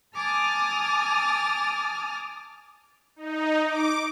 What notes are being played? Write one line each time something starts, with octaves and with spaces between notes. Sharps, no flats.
G#5 A5 D6 D#6 F6 A6
D#4
D6